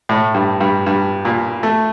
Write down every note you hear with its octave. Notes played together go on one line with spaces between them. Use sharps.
A2
G2
G2
G2
A#2
A3